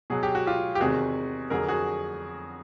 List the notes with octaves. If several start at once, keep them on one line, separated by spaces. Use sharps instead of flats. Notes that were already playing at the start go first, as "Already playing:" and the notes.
B2 F#3 G#4
G4
F#4
F4 G4
G4
E2 C3 D#3 F#4 G#4
F2 D3 F#3 G#4 A#4
F#4 G#4